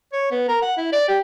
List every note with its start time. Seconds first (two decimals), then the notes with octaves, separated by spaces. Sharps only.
0.13 C#5
0.31 B3
0.48 A#4
0.62 F#5
0.77 E4
0.92 D5
1.08 G4